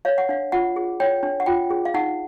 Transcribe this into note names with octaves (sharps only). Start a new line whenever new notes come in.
C#5 F5
F#5
D4 F5
F4 F#5
G#4
C#5 G5
D4
F#5
F4 G5
G#4
F5
D#4 F#5